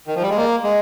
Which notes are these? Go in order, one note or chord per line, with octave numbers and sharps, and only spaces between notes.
D#3
F3
G3
G#3
A#3
G#3